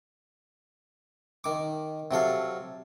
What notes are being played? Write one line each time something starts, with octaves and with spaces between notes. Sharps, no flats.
D#3 D6
C3 F#3 A4 F5